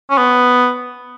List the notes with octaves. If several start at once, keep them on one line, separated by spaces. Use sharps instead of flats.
C#4
B3